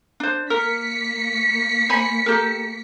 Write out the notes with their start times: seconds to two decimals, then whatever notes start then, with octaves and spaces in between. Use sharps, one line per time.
0.20 D4 C5
0.50 A#3 A#4 B6 C#7
1.89 C5 G#5 B5
2.26 G4 A4 A#4